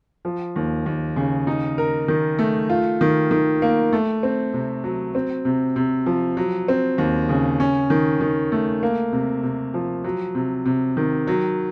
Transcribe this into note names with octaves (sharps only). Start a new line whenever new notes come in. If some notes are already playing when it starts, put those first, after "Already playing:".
F3
D#2
D#2
C#3
D#4
A#4
D#3
A3
F4
D#3
D#3
A#3
A3
C4
C3
F#3
C4
C3
C3
F3
F#3
C4
D#2
C#3
C#4
D#3
D#3
A3
A#3
C3
C3
F3
F#3
C3
C3
D#3
F#3